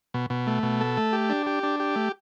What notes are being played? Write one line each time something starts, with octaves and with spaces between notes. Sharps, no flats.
B2
B2
A3
B2
A4
A3
G4
D4
G4
D4
G4
A3